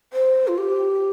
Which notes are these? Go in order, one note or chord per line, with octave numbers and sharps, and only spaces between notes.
C5
F4
G4